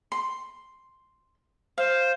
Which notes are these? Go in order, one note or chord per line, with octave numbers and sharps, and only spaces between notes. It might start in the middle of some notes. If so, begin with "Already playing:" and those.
C6
C5 F5